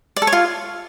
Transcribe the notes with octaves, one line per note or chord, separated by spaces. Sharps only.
D5
A4
C#5
F4